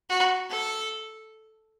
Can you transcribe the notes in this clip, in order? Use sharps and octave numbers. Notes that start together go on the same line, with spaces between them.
F#4
A4